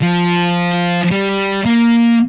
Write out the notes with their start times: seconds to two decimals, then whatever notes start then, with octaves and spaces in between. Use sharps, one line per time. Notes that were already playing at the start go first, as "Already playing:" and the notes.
0.02 F3
1.11 G3
1.66 A#3